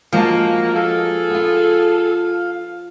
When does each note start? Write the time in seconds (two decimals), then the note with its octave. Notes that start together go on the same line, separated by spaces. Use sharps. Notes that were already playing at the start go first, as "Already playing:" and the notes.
0.12 F3 G#3 A#3 F#4 A5
0.74 G#4 A4 F5
1.30 B3 F4